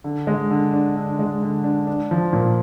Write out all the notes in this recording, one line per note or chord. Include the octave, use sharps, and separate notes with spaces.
D3
G#3
D3
D4
D3
G#3
D3
D4
D4
F3
A#2